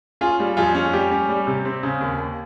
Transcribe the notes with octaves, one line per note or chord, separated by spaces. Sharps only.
C#4 F4 G#4
G3
F2 F4 G#4
C#4
G3 G4
C#4
G3
C3
C4
C#3
D#2
D#2